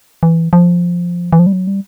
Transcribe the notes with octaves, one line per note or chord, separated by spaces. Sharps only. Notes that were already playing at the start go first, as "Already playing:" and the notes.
E3
F3
E3
F3
G3
F#3
G3